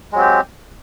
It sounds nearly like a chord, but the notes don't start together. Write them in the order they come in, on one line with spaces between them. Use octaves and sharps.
G#3 F#3 C4 G4